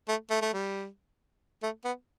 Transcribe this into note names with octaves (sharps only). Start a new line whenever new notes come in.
A3
A3
A3
G3
A3
B3